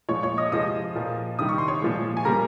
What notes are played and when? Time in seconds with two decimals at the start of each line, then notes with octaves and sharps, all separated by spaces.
0.09 A#2 F3 G#3 C#5 C#6
0.23 C#5 C#6
0.38 D#5 D#6
0.52 C3 F3 G#3 D#5 D#6
0.95 A#2 F3 A#3
1.39 C3 D#3 G3 D#6
1.49 C#6
1.58 C6
1.68 C#5 C#6
1.82 A#2 F3 G#3
2.17 G#5
2.25 C#3 G3 A#3 A#4 A#5